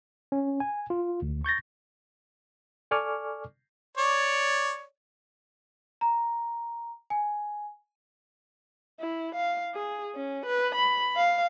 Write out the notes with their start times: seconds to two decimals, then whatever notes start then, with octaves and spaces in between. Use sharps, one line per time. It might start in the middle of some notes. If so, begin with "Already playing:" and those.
0.32 C#4
0.60 G#5
0.90 F4
1.22 D2
1.44 C#6 G6 A6 A#6
2.91 A4 D5 G#5 C#6 D6 F6
3.97 C#5 D5
6.01 A#5
7.10 G#5
9.00 E4
9.36 F5
9.74 G#4
10.15 C#4
10.46 B4
10.75 B5
11.17 F5